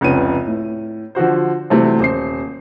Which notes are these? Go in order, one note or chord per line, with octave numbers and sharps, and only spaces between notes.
F1 C#2 B3 C#4 D#7
A2
D3 F3 F#4 C5
C3 E3 F#3 G3 A3 C4
D#1 C5 C7